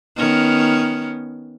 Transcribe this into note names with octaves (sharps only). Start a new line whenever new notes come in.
D#3 B3 C#4